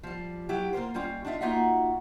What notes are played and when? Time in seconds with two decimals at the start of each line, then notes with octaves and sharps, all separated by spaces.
0.03 F3 G3
0.49 F#3 E4 G4
0.73 A#3 F4 A#4 C5
0.94 D#2 G3 C#4 F4
1.25 D4 D#4 F4 E5
1.41 A#3 D#4 F4 F#4 E5 F#5